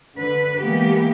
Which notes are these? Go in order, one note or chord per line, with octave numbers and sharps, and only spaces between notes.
D3 B4
E3 G#3 A#3 B3 G4